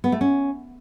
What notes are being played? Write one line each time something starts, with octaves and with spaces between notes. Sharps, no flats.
B3
A3
C#4